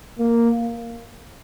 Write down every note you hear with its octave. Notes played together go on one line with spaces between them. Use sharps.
A#3